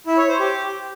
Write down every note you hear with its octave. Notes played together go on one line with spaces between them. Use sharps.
E4
C#5
C5
G4